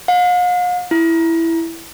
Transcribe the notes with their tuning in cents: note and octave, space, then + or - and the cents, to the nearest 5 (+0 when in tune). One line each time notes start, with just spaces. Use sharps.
F5 +45
E4 +5